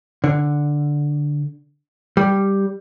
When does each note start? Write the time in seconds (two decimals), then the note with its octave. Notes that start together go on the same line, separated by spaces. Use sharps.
0.24 D3
2.17 G3